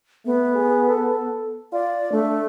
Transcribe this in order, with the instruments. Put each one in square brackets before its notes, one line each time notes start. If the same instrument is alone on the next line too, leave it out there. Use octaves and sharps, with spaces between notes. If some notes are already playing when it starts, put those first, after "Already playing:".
[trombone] A3 [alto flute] B3
[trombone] G#4
A4
[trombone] F4 [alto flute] D5
[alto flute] A3 [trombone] D4